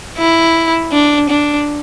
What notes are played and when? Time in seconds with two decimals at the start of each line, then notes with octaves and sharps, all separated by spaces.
0.18 E4
0.92 D4
1.29 D4